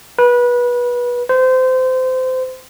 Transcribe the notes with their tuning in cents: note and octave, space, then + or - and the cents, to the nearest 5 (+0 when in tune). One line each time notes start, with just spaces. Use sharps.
B4 -25
C5 -25